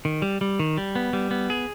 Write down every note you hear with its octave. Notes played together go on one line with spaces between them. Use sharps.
D#3
G3
G3
D#3
G3
B3
G3
B3
G#4